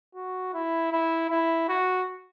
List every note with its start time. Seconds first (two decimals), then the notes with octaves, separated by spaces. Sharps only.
0.15 F#4
0.54 E4
0.92 E4
1.30 E4
1.68 F#4